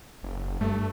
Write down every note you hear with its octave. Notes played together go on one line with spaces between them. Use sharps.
F#1
G2 A3